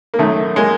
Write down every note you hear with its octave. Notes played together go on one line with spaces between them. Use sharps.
A#3
F#2 D#3 A3
G#3 A#3